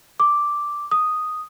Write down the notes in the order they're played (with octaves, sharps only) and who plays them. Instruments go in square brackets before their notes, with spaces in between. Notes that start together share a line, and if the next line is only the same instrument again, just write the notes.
[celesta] D6
D#6